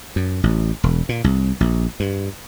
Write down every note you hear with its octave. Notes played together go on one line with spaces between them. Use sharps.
F#2
A1
E1
A#2
C2
A#1
G2